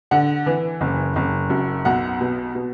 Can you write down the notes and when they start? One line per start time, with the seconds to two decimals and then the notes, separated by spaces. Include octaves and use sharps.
0.11 D3 F#5
0.46 E3
0.81 F#1
1.16 F#1
1.50 F#2
1.85 B1 F#5
2.21 B2
2.55 B2